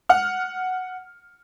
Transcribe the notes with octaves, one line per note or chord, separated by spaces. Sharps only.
F#5 F6